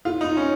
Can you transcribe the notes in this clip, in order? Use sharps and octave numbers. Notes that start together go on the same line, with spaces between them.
F4
D#4
C#4